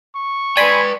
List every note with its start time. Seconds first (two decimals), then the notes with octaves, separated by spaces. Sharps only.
0.16 C#6
0.57 B4 D5 G5 G#5 B5 C6